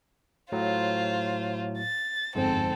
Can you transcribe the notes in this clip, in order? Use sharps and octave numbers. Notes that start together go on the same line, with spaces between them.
A2 F#3 F4 C5
A6
G1 F2 G#2 C4 A4